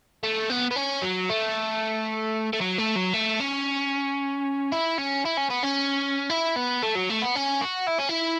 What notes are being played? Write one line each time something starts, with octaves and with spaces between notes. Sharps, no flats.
A3
B3
B3
C#4
F#3
A3
A3
F#3
A3
F#3
A3
C#4
E4
C#4
E4
C#4
B3
C#4
E4
B3
A3
F#3
A3
B3
C#4
F#4
E4
C#4
E4